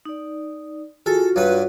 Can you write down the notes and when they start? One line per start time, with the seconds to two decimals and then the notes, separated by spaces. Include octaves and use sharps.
0.05 D#4 D5
1.06 F4 F#4 G#4 A4
1.36 G2 F#3 B4